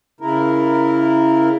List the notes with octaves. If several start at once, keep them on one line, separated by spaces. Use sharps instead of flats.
C#3 E4 A#4